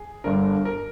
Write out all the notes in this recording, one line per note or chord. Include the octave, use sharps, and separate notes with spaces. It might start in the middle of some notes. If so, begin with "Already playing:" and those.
Already playing: G#4
G1 G2 D3 A#4
A#4